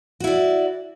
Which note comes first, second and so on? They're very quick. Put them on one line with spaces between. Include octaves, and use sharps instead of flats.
F#4 E4 D5